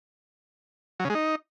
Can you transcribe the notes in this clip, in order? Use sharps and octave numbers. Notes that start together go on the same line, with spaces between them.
F#3
C#3
G#3
D#4